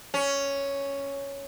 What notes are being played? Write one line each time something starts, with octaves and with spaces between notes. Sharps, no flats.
C#4